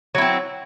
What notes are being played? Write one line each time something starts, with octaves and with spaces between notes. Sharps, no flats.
F#3 C4 E4